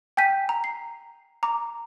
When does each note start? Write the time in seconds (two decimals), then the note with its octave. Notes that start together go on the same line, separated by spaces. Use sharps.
0.17 G5 G#5 G6 B6 D#7
0.49 A#5
0.64 C7
1.43 A#5 D6